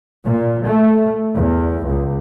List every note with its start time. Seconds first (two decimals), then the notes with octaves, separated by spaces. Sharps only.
0.25 A#2
0.65 A3
1.36 E2
1.86 C#2